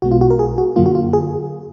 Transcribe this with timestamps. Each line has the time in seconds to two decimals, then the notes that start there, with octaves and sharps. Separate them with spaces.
0.02 B1 B2 G#3 B3 F#4
0.11 F4
0.21 F#4
0.30 A#4
0.39 G#4
0.58 F#4
0.76 F#2 D3 F#3 A#3 F4
0.86 F#4
0.95 F4
1.13 G#4